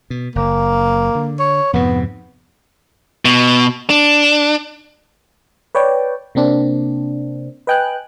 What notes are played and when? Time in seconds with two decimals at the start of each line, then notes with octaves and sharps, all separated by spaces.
0.10 B2
0.36 F#1 A#3
1.15 D3
1.39 C#5
1.73 F2 G#2 C3 B3
3.25 B2
3.90 D4
5.75 B4 C#5 D5 G5
6.35 C3 A#3 C4 D4
7.67 B4 D#5 G5 G#5 F#6